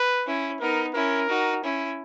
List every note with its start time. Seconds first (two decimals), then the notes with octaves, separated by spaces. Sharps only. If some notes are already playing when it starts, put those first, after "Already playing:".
Already playing: B4
0.26 C#4 E4
0.60 B3 D#4 A#4
0.94 C#4 E4 A#4
1.29 D#4 F#4
1.63 C#4 E4